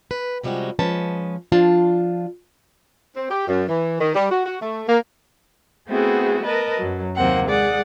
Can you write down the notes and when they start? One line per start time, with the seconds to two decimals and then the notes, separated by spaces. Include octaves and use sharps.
0.11 B4
0.43 C3 F3 G3 G#3 C#4 F#4
0.79 F3 G#3 C#4 B4 A5
1.52 F3 D4 F4 A5
3.16 C4
3.30 G4
3.48 F#2
3.68 E3
3.99 D#3
4.14 G3
4.30 F#4
4.46 F#4
4.61 A3
4.88 A#3
5.88 A3 B3 C4 E4 F#4 G#4
6.44 A#4 B4 D#5 A5
6.78 F#2 F#3
7.16 D#2 C3 F#3 A#3 C4 F#5
7.46 G#3 G#4 D5 F#5